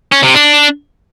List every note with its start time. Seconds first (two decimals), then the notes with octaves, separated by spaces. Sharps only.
0.12 C#4
0.23 C3
0.34 D4